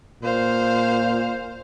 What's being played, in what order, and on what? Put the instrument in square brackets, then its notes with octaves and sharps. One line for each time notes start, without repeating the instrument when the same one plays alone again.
[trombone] A#2 [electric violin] C5 F5